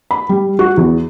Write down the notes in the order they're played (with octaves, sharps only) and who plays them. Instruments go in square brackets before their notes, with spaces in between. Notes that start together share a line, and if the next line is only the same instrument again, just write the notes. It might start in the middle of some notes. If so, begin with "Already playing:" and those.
[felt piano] B5
G3
F#4
E2